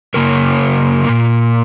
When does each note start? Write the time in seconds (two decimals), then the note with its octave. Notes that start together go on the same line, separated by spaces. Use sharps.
0.14 F#2 C#3 F#3 A#3 A#4
1.04 A#2 A#3